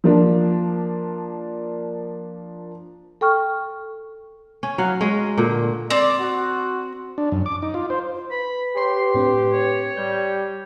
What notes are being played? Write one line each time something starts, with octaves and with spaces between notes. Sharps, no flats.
F3 A#3 D4
A4 G5 C#6 F6
C#4
F#3 F5 F#5
G#3 C#4
A#2 D3
C4 D5
F#4
D4
F#2
D6
D#4
F4
C5
B4 B5
G4 C#5 C6 C7
A2 C4 D4
C#5
G3 G6